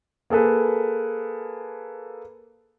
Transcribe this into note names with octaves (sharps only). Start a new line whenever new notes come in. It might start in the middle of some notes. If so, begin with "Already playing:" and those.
A#3 G#4 A4 B4